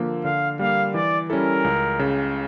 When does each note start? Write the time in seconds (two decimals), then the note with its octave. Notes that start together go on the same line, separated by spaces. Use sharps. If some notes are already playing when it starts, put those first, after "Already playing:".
Already playing: D3 F3 A#3
0.25 D3 F5
0.59 G3 A#3 F5
0.94 E3 D5
1.30 G3 C#4 E4 A4 A#4
1.64 C#2
1.99 C#3